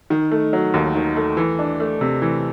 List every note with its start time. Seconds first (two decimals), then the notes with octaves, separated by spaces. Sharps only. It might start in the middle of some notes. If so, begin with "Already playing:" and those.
0.10 D#3
0.32 A3
0.53 F#3
0.74 D#2
0.95 D#3
1.16 A3
1.37 E3
1.59 D4
1.80 A3
2.01 C3
2.22 E3